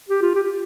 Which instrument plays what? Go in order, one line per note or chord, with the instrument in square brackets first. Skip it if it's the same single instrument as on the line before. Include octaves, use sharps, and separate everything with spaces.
[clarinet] G4
F4
G4